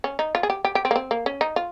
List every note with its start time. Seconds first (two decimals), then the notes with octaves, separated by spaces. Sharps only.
0.04 C#4
0.19 D#4
0.35 F4
0.43 G#4
0.50 G4
0.65 G4
0.75 G4
0.85 C4
0.91 A#3
0.96 C4
1.11 A#3
1.26 C#4
1.41 D#4
1.56 F4